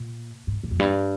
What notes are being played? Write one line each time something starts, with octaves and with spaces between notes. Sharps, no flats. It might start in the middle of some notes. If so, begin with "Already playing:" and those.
Already playing: A#2
G#2
A#2
F2
G2